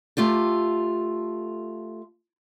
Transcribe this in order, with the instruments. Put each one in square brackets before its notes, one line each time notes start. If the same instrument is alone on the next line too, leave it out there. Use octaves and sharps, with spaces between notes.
[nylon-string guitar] A3 F4 G4 A4